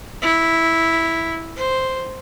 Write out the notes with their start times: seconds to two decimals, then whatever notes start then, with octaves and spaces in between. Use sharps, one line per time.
0.22 E4
1.56 C5